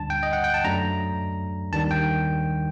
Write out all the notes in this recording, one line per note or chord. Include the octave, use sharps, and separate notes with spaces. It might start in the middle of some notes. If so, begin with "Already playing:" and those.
Already playing: D2 D3 G3 D4 A5
G5
D#5
F#5
G5
A5
F#2 F#3 A3 D4 A#5
D#2 D#3 G3 D4 A5
G5